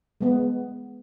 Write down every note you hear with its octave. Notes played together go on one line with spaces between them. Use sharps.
G#3 B3